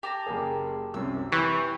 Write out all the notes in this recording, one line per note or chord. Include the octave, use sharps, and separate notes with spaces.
G4 A5 A#5
F#1 A#3 G#4
C2 F#2 C3 E6
E3 G4 C#6 G6